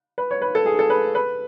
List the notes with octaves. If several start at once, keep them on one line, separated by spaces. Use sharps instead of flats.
B4
C#5
B4
A4
G#4
A4
B4
B4